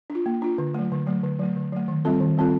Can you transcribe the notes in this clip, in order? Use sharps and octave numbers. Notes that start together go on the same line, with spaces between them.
D4
F4
A#3
D4 F4
D3
F#3 A3
D3
F#3 A3
D3
F#3 A3
D3
F#3 A3
D#3
G3 C4 F4 A4
D#3
G3 C4 F4 A4